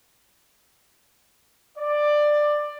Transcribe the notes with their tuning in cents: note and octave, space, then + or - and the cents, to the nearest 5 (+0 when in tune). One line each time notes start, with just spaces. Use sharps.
D5 +15